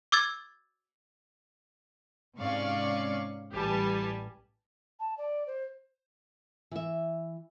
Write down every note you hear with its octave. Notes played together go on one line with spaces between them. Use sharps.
D6 E6 G#6 A6
G#2 C3 C#4 D5 F5 C#6
A1 G3 G4 B4 G#5 A5
A5
D5
C5
E3 E5